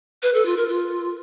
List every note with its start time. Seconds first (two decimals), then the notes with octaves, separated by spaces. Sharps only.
0.23 B4
0.34 A4
0.46 F4
0.57 A#4
0.68 F4